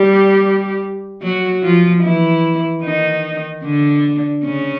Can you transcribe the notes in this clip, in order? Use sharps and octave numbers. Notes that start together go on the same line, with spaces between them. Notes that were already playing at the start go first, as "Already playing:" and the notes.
Already playing: G3 G4
F#3 F#4
F3 F4
E3 E4
D#3 D#4
D3 D4
C#3 C#4